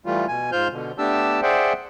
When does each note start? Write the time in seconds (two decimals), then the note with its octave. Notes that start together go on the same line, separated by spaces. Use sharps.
0.06 E3 G3 A3 F4
0.28 B2 G#5
0.52 G#2 F4 C5 F6 G6
0.72 B2 D3
0.98 A3 B3 D4 G4 A5 E6
1.42 G#4 C5 D5 E5 F#5 G5